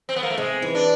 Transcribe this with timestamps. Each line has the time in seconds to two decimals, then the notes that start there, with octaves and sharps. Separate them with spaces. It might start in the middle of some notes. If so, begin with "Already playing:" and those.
0.09 C4
0.16 B3
0.23 A#3
0.30 A3
0.38 C3 G#3
0.62 E3
0.75 D4